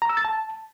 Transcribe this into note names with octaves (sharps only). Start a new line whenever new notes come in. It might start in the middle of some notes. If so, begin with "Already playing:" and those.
A#5
E6
A6
A5